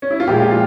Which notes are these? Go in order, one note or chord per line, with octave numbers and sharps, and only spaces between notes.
C#4
E4
F4
A#2 F3 G#3 G4
F4